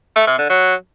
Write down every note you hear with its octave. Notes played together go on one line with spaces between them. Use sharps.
A3
C3
D3
F#3